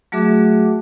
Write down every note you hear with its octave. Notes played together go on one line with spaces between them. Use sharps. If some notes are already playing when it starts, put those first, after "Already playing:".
F#3 A3 F#4 G#4 E5 D6